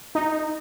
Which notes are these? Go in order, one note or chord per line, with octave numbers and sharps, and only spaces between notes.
D#4